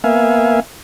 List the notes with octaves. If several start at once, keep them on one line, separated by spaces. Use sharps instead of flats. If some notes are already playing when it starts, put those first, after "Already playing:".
A#3 B3 E5 F5 G#5